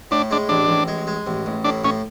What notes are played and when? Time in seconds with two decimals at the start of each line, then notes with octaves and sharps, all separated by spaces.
0.11 A2 D4
0.31 G#3 D4
0.49 A1 D4
0.68 A1
0.88 G#3
1.07 G#3
1.27 A1
1.46 A1
1.64 A2 D4
1.84 A2 C#4